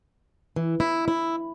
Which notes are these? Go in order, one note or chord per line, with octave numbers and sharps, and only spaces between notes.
E3
E4
E4